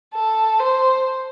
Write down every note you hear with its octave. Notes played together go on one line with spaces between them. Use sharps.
A4
C5